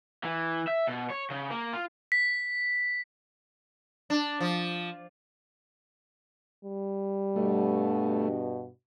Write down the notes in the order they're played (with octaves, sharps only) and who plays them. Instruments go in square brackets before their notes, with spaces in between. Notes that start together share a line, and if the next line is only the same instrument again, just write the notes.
[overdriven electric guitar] E3
E5
B2
C#5
C#3
A#3
F4
[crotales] B6
[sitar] D4
F3
[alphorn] G3
[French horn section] G2 B2 [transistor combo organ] A3